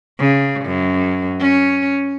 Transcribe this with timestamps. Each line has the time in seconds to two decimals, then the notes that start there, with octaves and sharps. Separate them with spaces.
0.19 C#3
0.65 F#2
1.40 C#4